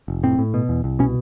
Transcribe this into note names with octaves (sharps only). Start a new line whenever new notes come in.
F1
A2 C4
A2
B2
E2
C2
B2 C#4